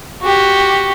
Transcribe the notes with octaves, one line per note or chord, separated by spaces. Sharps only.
F#4 G4